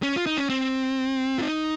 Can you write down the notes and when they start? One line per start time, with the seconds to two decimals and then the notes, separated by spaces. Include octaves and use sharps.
0.03 C#4
0.16 F4
0.26 D#4
0.38 C#4
0.50 C4
1.38 F4
1.42 D#4